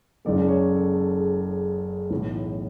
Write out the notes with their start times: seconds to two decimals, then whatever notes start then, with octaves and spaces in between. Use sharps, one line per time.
0.25 F#1 F#2 C#3 G#3 D5
0.48 C#5
0.72 A4
0.95 A4
1.18 G#4
2.11 B1 A2 E3